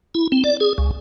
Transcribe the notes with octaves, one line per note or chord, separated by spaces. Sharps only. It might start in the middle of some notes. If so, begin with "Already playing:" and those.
E4
C4
D5
G#4
C#2